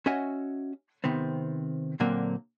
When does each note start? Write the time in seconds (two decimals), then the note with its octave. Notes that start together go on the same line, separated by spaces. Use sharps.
0.06 C#4 F#4 D#5 E5 F#5 G#5
1.04 C3 D#3 B3 C4
2.00 A#2 D3 F#3 A#3 C4